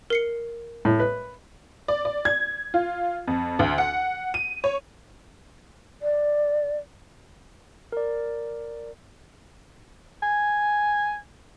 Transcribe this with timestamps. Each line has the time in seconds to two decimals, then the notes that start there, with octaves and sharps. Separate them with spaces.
0.10 A#4 C7 C#7
0.85 A2
1.00 B4
1.88 D5
2.05 D5
2.25 G#6
2.74 F4
3.27 F2
3.59 D2
3.78 F#5
4.34 D#7
4.64 C#5
6.02 D5
7.92 A#4 D5
10.23 G#5